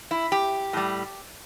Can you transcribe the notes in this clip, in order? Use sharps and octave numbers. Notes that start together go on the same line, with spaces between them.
E4
G4
A2 G3